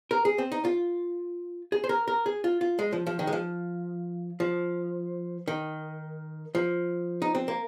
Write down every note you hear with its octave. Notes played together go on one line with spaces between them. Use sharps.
A#4
G#4
C4
D#4
F4
G#4
C5
A#4
A#4
G#4
F4
F4
G#3
F3
F3
D#3
G#3
F3
F3
D#3
F3
D#4
C4
A#3